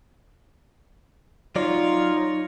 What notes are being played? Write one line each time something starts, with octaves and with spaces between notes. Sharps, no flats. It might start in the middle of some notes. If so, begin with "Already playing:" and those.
F#3 D#4 F4 C#5 D5 A#5 C#6